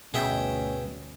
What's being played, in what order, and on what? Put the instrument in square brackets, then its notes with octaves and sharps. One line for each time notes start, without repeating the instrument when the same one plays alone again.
[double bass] G1 D2 [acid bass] B2 [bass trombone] C#4 [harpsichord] G#4 E5 G5